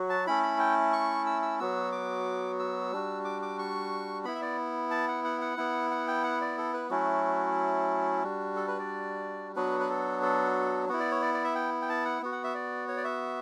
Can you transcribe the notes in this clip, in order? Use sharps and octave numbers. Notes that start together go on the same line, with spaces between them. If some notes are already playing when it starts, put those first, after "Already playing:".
Already playing: F#3 F#4
A5
A3 C#4 E4 B5
B5
G5
C#6
E6
E6
F#3 B3 F#4 E6
D6
E6
G3 D4 F#4
D6
D6
C#6
B3 E4 B5
E5
D5
A5
F#5
F#5
F#5
B3 E4
F#5
G5
F#5
D5
A4
B4
F#3 A3 C#4 E4 F#4
G3 D4 F#4
A4
B4
D5
F#3 B3 D4 F#4 B4
B4
A4
A4
B3 E4 F#4
D5
C#5
D5
D5
E5
G5
G5
A5
F#5
B3 F#4
F#5
E5
D5
C#5
D5
E5